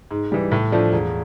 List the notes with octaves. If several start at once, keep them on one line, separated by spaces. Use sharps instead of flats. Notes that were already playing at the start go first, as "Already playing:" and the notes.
G#2
E3 G3
A2
F3 A3 D4
E1